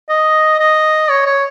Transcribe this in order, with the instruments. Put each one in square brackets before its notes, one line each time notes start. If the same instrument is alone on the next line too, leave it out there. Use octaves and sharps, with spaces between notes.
[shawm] D#5
D#5
C#5
C#5